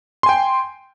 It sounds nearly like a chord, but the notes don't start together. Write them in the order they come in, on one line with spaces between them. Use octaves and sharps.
C6 G#5 G5